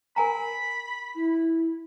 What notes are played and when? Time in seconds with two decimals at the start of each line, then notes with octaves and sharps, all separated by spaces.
0.16 A#4 G#5 A#5 B5
1.15 E4